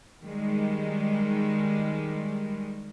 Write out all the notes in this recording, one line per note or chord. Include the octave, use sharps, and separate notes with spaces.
D#3 G3 G#3